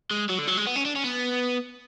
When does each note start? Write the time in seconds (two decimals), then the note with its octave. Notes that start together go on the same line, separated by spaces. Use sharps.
0.11 G#3
0.29 F#3
0.38 D3
0.47 F#3
0.57 G#3
0.67 B3
0.76 C#4
0.85 D4
0.96 C#4
1.04 B3